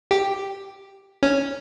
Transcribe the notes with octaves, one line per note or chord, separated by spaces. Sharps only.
G4
C#4